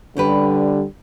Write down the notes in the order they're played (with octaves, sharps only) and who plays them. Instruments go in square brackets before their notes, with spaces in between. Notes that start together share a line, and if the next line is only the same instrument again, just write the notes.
[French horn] D3 [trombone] G3 [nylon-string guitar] C#4 G4 B4